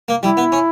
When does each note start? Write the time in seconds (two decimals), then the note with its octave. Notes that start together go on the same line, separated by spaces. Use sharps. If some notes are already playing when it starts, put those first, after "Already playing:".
0.08 A#3
0.23 G3 E4
0.37 B3
0.52 C#4